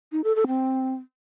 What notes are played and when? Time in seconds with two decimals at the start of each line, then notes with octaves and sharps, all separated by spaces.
0.12 D#4
0.24 A4
0.36 A4
0.47 C4